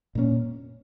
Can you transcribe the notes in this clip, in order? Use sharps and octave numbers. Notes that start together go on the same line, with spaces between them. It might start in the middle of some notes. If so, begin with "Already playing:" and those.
A#2 A#3 C#4